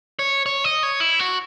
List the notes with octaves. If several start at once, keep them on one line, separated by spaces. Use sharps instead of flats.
C#5
C#5
D#5
C#5
E4
F#4